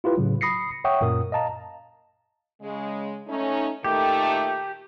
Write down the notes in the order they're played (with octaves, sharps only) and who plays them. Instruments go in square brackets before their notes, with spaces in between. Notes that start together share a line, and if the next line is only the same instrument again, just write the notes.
[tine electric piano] E4 F4 G4 B4
A2 C#3 F#3
B5 D#6 A#6 C7 C#7
C#5 E5 F#5 G5 C#6 D#6
F#2 A#2 A#4 D#6
D#5 F5 A5 A#5
[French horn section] C#3 G#3
A3 C#4 D#4
[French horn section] A#2 D#3 A3 [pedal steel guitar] G4